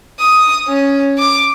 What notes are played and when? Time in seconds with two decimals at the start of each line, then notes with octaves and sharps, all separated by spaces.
0.20 D#6
0.68 C#4
1.18 D6